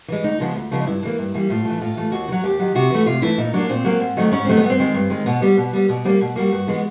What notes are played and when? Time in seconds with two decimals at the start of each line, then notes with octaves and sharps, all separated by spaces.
0.08 E3 G#3
0.24 D2 D#4
0.40 C#3 F3 G#3 B3
0.56 D2
0.71 C#3 F3 G#3 B3
0.80 D#4
0.87 G2 E4
1.03 E3 G3 A#3
1.19 G2
1.34 E3 G3 A#3
1.50 A2 F4
1.65 E3 A3
1.81 A2 F4
1.97 E3 A3
2.12 D#2 F#4
2.28 D#3
2.32 F#3
2.44 D#2 G4
2.59 D#3 F#3
2.75 C3 F#4
2.90 E3 A3
3.06 C3 F4
3.22 E3 A3 E4
3.38 A#2 D#4
3.53 F#3 A#3 D4
3.69 A#2 C4
3.84 F#3 A#3
4.00 G#2
4.17 D#3 F#3 A3
4.32 G#2 C#4
4.45 D#3 F#3 A3 C4
4.57 B3
4.64 G2
4.70 C4
4.79 D#3 G#3
4.94 G2
5.10 D#3 G#3
5.26 B2 B3
5.42 G3 B3
5.57 B2
5.73 G3 B3
5.89 B2 B3
6.05 G3 C4
6.08 A#3
6.21 B2
6.36 G3 A#3 F#4
6.52 G2
6.68 E3 G#3 B3